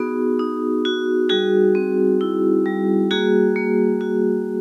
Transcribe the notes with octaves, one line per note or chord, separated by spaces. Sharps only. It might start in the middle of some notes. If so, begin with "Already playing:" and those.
Already playing: B3 D#4 F#4 G#4
D#4
F#4
G3 F#4 G#4
C4
E4
G3
A#3 F#4 G#4
A#3
F#4